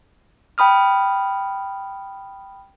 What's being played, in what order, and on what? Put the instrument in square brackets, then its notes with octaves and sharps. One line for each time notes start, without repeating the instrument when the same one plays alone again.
[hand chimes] G5 B5 D#6 F6